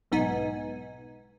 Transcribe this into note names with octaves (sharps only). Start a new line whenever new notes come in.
B1 G#2 B3 D#4 G#5